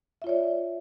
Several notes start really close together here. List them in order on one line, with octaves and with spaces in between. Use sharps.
E5 F4 C#5 D5